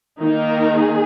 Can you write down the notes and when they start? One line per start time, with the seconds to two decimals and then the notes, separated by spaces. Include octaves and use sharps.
0.21 D#3 A#3 D#4 A#4
0.75 G#4